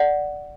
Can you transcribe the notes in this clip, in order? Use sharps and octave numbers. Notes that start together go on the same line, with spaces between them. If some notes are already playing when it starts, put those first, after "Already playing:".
Already playing: D5 F#5